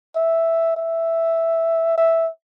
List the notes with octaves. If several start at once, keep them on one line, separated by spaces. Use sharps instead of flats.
E5
E5
E5